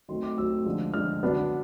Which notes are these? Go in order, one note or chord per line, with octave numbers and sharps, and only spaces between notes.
D#3 F#3 A3 C4 C6
D6
D#3 F#3 A3 C4 E6
D3 F3 G#3
D3 F3 G#3 F6
D3 F#3 B3 D4